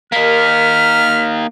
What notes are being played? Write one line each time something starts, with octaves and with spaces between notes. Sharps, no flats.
A#3 D#4 A#4 F6 B6